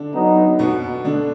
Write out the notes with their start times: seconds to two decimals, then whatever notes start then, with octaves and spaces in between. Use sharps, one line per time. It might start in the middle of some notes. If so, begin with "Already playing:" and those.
Already playing: D3 D4
0.14 F#3 B3 D#4
0.59 B2 B3
1.05 D3 D4